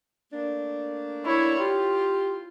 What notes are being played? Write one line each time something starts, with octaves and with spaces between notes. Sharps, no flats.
A3 A#3 D4
E4 C#5
F4 G4